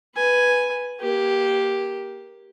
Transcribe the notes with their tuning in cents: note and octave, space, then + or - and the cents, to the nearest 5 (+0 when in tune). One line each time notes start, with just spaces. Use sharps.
B4 +0 G#5 +0
A#3 +15 G4 +0